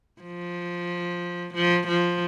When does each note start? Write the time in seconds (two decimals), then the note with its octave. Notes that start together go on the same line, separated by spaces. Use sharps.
0.22 F3
1.54 F3
1.88 F3